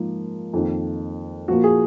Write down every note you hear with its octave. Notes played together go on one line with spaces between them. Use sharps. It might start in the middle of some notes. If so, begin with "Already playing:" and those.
Already playing: G#2 F3 A#3
F2 D#3 A#3
A#2 F3 A#3 F#4
G#4